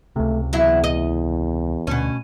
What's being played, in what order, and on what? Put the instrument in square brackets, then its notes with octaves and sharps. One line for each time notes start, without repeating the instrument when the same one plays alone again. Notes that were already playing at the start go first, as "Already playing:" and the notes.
[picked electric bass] C#2 C3 [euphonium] A3
[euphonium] E2 [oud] F#3 E4
[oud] D#5
[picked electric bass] D2 [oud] B2 C#4